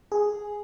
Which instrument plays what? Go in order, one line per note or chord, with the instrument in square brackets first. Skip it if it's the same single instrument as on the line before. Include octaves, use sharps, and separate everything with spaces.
[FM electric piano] G#4